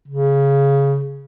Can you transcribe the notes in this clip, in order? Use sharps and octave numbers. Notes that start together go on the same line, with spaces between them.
C#3